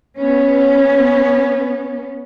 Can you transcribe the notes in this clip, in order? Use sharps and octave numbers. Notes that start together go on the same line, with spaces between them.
B3 C#4